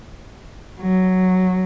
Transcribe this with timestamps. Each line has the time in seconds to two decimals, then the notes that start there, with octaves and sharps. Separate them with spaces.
0.80 F#3